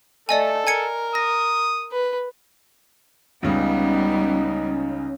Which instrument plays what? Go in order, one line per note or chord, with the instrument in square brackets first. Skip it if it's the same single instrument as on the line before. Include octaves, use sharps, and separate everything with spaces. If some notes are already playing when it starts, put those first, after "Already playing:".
[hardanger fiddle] A3 [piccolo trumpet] A4 [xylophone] D5 D#5 G#5
[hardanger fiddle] A#4 [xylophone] G#5 G#6 C#7
[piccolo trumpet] D#6 [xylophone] A#6
[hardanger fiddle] B4
[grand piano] C#2 C#3 [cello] G3 B3 [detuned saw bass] C#4 [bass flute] D#4